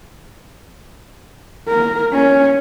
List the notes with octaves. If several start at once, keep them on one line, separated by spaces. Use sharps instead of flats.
A#4
C#4